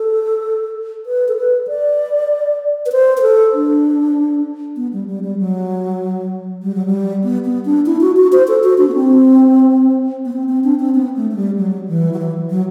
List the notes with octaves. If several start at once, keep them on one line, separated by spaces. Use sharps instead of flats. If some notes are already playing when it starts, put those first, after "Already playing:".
Already playing: A4
B4
A4
B4
D5
B4
C5
B4
A4
D4
B3
G3
G3
G3
F#3
G3
F#3
G3
B3
B3
D4
E4
F#4
F#4
C5
A4
F#4
D4
B3
C4
B3
C4
C4
D4
C4
B3
A3
A3
G3
F#3
E3
F#3
E3
F#3